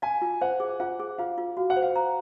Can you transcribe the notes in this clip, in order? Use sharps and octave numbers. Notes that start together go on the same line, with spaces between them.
F5 G#5
F4
C5 F#5
G#4
F4 F#5
G#4
F4 F5
F4
F#4 F5
F#5
C5
F5
A#5